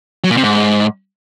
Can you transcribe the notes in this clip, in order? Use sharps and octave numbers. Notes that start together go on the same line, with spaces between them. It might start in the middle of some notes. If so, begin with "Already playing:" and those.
F#3
A#2
C3
G#2